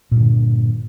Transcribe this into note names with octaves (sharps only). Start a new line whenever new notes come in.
G2 A#2 D3